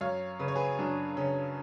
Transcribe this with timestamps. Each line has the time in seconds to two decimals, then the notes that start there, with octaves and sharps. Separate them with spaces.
0.01 F#2 C#5 F5
0.39 C#3 B4
0.48 C#5
0.56 G#4 B4
0.79 F#2 D4
1.17 C#3 C#4